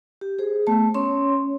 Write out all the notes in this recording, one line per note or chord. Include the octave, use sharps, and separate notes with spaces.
G4
G#4 C5
A3 B3 A5
C#4 C#5 C6